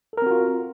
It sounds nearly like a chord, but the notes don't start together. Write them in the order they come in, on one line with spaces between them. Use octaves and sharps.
A4 A#4 C4 F#4 F4